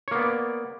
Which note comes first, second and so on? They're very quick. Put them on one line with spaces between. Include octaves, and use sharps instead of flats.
C#5 A#3 B3 D5